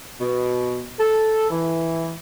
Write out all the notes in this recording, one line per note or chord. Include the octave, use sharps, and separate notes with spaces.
B2
A4
E3